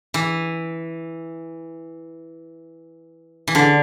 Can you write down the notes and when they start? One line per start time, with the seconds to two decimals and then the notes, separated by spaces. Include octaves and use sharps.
0.14 E3
3.48 E3
3.55 D3